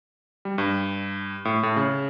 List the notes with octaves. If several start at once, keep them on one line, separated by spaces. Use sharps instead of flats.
G3
G2
A2
A2
C#3